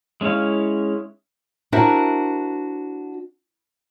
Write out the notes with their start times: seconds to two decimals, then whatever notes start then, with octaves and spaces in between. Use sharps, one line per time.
0.21 G#3 C#4 E4 C#5 F5
1.72 D4 E4 F#4 A#4 C5 E5